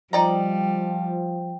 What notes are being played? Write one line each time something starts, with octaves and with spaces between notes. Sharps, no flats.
F3 G3 D#4 D5 G5 A#5